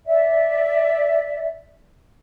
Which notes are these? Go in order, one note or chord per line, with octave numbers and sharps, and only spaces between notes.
D5 E5